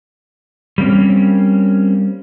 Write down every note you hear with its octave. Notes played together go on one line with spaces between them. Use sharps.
G3 A#3 C4 C#4